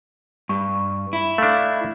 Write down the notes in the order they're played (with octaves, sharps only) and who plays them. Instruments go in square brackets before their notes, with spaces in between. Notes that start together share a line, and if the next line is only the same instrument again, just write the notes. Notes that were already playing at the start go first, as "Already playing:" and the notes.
[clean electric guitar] G2 [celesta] C#6
[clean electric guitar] E4
[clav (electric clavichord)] A3 D4 [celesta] F5 F6